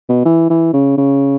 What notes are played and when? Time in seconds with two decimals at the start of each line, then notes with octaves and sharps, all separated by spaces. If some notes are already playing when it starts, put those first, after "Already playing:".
0.09 B2
0.25 E3
0.50 E3
0.74 C#3
0.98 C#3